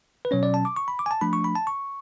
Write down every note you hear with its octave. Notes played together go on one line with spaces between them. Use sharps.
B4
B2 F#3 C#4 C#5
D5
A5
D6
C#6
B5
D6
G#5
A5
F3 A3 D4 B5
C#6
B5
A5
C#6